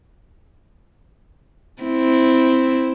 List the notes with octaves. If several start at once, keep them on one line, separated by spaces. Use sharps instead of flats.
C4 E4